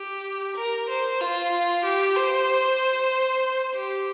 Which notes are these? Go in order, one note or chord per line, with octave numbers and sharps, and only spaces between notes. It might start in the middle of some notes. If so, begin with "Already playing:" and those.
Already playing: G4
A#4
C5
F4
G4
C5
G4